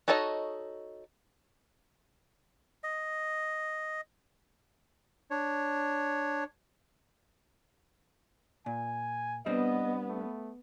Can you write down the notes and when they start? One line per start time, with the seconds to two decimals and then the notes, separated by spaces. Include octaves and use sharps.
0.08 D#4 F#4 A4 C#5 D#5
2.84 D#5
5.31 D4 C#5
8.66 A#2 G#5
9.46 G3 B3 C4 D4 D#5
10.09 A3